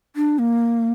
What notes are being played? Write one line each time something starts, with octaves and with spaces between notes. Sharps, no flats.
D4
A#3